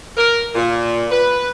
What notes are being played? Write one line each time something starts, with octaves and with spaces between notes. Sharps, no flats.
A#4
A#2
B4